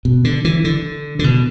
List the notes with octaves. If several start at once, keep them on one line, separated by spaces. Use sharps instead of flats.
B2
D3
E3
D3
D3
B2